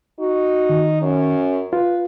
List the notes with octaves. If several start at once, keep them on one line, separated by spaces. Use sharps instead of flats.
D#4 F#4
D#3
F#2 C#4
F4 B4